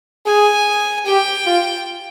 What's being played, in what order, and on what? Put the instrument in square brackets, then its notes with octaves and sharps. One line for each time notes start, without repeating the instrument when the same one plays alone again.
[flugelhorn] G#4 [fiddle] G#5
[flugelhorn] G4 [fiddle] G5
[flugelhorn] F4